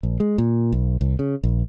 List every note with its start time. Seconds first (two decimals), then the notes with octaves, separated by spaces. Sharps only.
0.03 A#1
0.20 G#3
0.38 A#2
0.72 B1
1.01 C2
1.19 C#3
1.44 A#1